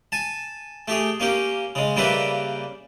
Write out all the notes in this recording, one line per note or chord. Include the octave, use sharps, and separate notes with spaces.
G#5 A5
A3 G4 G#4
A#3 C#4 G4
C#3 G#3
C#3 G3 A#3 G4 B4 E5